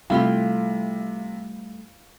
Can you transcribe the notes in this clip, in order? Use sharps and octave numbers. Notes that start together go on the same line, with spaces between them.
C3 G3 A3 E4 F4 G4 F5